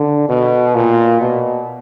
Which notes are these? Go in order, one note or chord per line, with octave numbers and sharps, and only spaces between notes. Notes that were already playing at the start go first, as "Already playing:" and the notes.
Already playing: D3
B2
A#2
B2